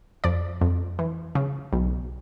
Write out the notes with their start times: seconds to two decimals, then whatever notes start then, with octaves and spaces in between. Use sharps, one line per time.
0.24 F2 D5
0.61 F2
0.99 E3
1.35 C#3
1.73 B1